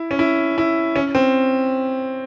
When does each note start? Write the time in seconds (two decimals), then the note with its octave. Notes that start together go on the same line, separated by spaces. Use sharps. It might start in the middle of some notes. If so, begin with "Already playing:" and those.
Already playing: E4
0.11 C#4
0.19 E4
0.58 E4
0.96 C#4
1.15 C4